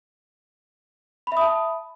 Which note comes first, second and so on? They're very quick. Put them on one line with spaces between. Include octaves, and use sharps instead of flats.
B5 E5 D#6 A5